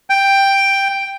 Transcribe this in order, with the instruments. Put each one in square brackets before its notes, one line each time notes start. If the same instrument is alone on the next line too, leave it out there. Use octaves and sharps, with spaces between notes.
[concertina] G5